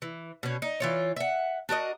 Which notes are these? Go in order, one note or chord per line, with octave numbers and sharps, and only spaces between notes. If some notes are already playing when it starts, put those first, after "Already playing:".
E3
B2 C#4
D#4
E3 F4 C#5
E5 F#5
D4 F#4 A#4 D#5